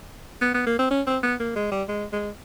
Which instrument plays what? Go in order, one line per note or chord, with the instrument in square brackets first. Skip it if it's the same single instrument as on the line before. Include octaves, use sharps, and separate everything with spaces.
[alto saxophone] B3
B3
A#3
C4
C#4
C4
B3
A#3
G#3
G3
G#3
G#3